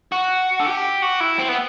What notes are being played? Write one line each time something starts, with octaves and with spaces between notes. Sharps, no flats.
F#4
A4
G4
F#4
E4
C4
B3